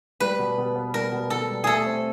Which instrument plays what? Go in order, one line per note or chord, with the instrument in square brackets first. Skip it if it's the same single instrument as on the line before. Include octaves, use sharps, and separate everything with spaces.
[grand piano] G3 [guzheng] B4
[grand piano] B2
B2
B3
[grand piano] G3 [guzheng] A#4
[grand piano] B2
[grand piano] B2 [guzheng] A4
[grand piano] G3
[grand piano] A3 [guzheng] G#4 A4
[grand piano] C4